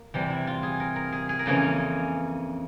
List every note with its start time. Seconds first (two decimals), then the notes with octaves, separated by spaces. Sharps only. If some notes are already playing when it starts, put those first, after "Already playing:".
Already playing: A#3
0.14 E2 C3 G3
0.30 E4
0.47 F4
0.63 G#4
0.80 A#4
0.96 A#4
1.12 G#4
1.29 G#4
1.39 A#4
1.46 F2 C#3 E3 A#3 C#4 G#4